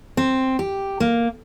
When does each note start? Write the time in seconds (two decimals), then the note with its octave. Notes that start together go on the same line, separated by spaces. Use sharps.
0.17 C4
0.59 G4
1.00 A#3